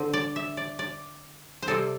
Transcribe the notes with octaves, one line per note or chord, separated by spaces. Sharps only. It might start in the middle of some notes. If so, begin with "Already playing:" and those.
Already playing: D3 C4
D5
E5
D5
D5
C5
C3 G3 C4 A4